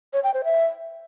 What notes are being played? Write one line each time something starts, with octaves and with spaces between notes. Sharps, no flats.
C#5
G5
C5
E5